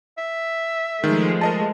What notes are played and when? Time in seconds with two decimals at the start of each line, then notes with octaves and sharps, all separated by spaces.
0.18 E5
1.04 D#3 F3 G#3 A3
1.41 A#4 D#5 A5